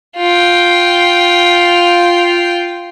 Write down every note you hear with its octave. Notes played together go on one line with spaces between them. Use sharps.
F4 G5